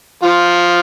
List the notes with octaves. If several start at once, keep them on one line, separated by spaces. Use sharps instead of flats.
F3 F4